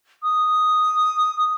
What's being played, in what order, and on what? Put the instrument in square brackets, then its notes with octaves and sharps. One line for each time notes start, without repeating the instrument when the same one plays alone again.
[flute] D#6